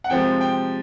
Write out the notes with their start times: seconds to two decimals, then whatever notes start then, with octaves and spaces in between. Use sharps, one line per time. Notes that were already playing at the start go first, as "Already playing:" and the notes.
0.04 F#5
0.10 C3 F3 G#3 G5
0.41 G5